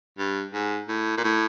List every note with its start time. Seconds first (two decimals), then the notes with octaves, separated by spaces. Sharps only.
0.18 G2
0.53 G#2
0.88 A2
1.17 A#2
1.24 A2